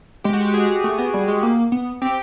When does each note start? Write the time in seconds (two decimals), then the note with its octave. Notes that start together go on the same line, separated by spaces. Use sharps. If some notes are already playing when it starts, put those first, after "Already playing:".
0.24 G#3 G4
0.33 F#4
0.41 G4
0.54 G#4
0.84 A3
0.98 B3
1.14 G3
1.28 G#3
1.43 A#3
1.72 B3
2.02 C4 G4